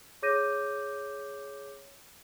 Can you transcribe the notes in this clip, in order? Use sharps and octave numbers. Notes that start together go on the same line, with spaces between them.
G#4 C#5 D6 G6 A#6 D#7